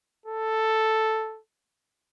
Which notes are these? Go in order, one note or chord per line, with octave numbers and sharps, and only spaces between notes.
A4